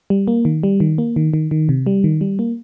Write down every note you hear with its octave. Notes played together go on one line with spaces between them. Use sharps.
G3
A#3
D#3
G3
D#3
A#3
D#3
D#3
D#3
C3
G3
D#3
G3
A#3